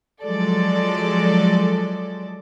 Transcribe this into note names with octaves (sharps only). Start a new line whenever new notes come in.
F3 F#3 G#3 A4 D5